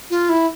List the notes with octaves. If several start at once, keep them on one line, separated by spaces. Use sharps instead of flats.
F4
E4